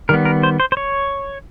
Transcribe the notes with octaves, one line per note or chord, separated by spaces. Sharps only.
D#3 G3 B3 A#4
A#4
C5
C5
C5
C#5